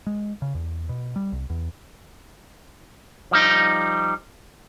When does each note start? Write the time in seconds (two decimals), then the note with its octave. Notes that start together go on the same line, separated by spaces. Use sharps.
0.07 G#3
0.42 C#3
0.55 E2
0.89 B2
1.16 G3
1.32 C2
1.50 E2
3.31 F3 G3 D#4